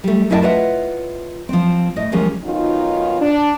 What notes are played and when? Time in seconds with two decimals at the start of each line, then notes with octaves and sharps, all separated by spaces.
0.04 G3 A3
0.30 F#2 E4 D#5 E5 G5 A5
0.42 F4 B4 C#5 D#5 E5 F#5
1.49 F3 C4
1.96 A2 D#5
2.12 D#2 F3 G#3 C#4
2.44 D#3 F#3 B3 C#4 D#4 F4
3.20 D4